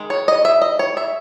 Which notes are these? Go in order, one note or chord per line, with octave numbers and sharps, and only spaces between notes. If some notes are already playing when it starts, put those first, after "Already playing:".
Already playing: D#3 G#3
C#5
D#5
E5
D#5
C#5
E5